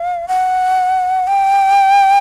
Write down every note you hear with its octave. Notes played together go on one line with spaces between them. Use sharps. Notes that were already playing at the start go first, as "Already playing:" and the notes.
Already playing: F5
F#5
G5